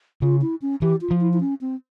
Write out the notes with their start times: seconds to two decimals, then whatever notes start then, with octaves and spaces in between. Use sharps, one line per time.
0.22 C#3 F4
0.41 E4
0.62 C#4
0.82 E3 G4
1.01 F4
1.11 F3
1.21 E4
1.33 E4
1.41 C#4
1.61 C4